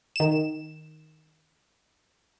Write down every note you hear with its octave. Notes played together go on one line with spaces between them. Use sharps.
D#3 E7